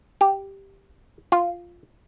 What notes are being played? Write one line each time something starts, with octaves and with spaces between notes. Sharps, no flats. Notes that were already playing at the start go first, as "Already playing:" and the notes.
G4
F4